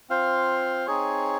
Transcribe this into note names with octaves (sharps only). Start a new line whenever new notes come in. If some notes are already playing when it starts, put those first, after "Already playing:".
C4 F4 C5 F5
C4 D#4 G#4 C#5